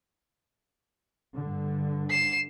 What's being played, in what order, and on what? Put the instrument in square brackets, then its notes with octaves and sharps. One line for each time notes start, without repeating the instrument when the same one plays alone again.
[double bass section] G2 D3
[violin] C7 E7